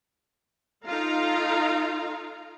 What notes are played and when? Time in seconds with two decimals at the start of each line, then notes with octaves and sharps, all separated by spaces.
0.85 D#4 F4 A4 F5 A#5